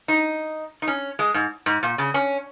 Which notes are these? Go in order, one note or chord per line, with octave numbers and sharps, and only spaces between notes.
D#4
D#4
C#4
G#3
G#2
G#2
A#2
C#3
C#4